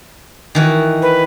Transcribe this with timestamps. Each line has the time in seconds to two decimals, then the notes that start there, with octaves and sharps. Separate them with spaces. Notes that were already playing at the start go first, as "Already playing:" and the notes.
0.55 D#3 E3 F#4
1.02 B4